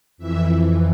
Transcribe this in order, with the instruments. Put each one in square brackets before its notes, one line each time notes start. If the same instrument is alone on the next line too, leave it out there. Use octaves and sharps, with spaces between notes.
[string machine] F2 E3 E5